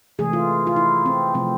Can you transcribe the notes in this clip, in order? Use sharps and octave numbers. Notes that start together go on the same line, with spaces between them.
C3 E3 A3 G#4
F4
F4
E4
C4
C3 F3 A3 C4